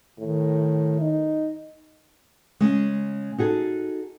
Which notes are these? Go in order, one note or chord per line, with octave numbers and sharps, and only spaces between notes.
A2 D#3
D#4
C#3 G#3
D#4 F#4 G#4 A4